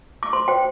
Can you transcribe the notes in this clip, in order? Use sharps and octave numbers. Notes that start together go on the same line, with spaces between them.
D6
C5 C6
C5 G5